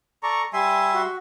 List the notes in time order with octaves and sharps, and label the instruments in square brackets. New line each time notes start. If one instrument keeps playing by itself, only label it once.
[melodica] A4 D5 [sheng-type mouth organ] A#5 C#6
[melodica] G3 E5 C6 [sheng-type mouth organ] G#5
[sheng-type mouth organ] F#4